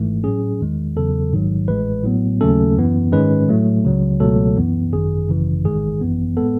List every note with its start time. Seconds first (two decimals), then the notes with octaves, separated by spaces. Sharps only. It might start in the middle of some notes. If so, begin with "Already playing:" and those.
Already playing: G#1 G#2 E3 A3
0.23 A2 F#3 C#4 G#4
0.61 E2 D#3 G#3
0.96 E2 C#3 F#3 A4
1.32 A1 G#2 D#3 F#3
1.68 A1 A2 G#3 B4
2.04 A2 F#3 B3
2.41 D#2 C#3 F#3 A3 C#4 A4
2.76 F#2 E3 B3
3.12 G#2 D#3 G#3 C#4 B4
3.49 A2 F#3 A3
3.85 C#2 C#3 F#3
4.20 C#2 B2 F#3 A3 A4
4.56 F#2 E3 B3
4.92 G#1 F#2 D#3 G#4
5.28 G#1 F#2 C#3 E3
5.64 A1 G#2 D#3 G#3 G#4
6.01 G#1 F#2 E3 B3
6.37 A2 G#3 B3 A4